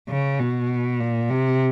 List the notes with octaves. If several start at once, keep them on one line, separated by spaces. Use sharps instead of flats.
C#3
B2
A#2
C3